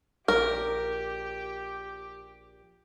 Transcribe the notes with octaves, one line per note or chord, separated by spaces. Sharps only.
A#1 G4 A#4